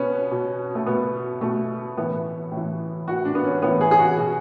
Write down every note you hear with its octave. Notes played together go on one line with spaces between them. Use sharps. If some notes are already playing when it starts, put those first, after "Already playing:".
Already playing: B2 B3 C#4
B2
A3
B2 B3
B2 A3
A2 E3 B3
A2
E3
A2 E3 F#4
D4
B3
C#4
A2 E3 B3
G#4
G#4
F#4
B2